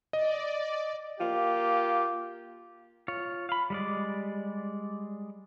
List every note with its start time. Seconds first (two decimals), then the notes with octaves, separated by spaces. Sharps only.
0.13 D5 D#5
1.21 A#3 F4 G4
3.08 F4 C#5
3.49 F5 B5
3.70 G3 G#3 D5